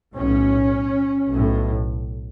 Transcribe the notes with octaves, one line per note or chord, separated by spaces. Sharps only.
B1 A2 C#4
B1 A2